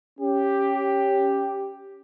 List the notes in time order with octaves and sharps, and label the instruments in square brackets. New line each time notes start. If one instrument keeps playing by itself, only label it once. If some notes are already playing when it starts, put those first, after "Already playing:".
[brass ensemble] C#4 G4